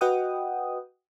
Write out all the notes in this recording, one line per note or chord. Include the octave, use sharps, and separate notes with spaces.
F#4 B4 D#5 F#5 G5 D#6